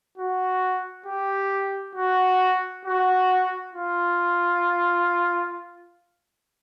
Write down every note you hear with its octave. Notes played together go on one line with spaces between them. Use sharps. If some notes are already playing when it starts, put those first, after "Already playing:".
F#4
G4
F#4
F#4
F4